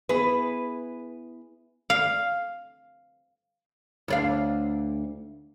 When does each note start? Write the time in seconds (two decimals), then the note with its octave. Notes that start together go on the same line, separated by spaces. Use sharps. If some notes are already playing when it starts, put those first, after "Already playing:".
0.09 B3 E4 G#4 B4
1.90 F5
4.08 D2 D4 F5